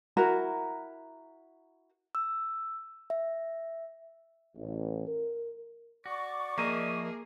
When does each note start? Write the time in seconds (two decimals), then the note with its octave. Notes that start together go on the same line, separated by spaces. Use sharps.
0.17 E4 F#4 A#4 A#5
2.15 E6
3.10 E5
4.55 A1
5.07 A#4
6.06 F#4 D5 C#6 D6
6.58 F3 A#3 G#4 A#4 D#5 E5